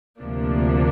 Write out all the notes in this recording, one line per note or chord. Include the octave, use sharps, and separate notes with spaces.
D2 C3 F3 A#3 D4